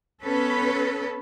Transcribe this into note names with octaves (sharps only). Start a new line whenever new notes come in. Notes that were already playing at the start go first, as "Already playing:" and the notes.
B3 C#4 A4 B4